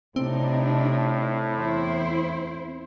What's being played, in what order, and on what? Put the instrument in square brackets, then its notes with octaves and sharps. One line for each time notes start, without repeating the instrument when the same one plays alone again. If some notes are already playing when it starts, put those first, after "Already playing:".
[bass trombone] A2 [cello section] C3 D4 D#4 [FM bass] C4
[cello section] E2 E4 C5